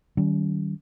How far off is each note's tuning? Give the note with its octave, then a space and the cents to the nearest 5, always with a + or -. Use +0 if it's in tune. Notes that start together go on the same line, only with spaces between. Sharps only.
D#3 -10 G3 -35 C#4 +25